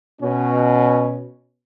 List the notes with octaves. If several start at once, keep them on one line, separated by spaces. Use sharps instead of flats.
B2 C#4